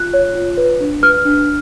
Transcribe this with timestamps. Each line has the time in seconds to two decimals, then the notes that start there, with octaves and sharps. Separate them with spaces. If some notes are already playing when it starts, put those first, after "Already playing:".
Already playing: F4 F#6
0.14 C#5
0.35 F4
0.57 B4
0.80 D4
1.02 B4 F6
1.25 D4